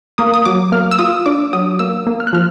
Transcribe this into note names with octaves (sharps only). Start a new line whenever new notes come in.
A#3 D#6
D#6
F#3 D6
A#3 F6
E6
F4 D#6
D4 D6
F#3 D#6
A#3 E6
A#3
F6
F#6
F3 F6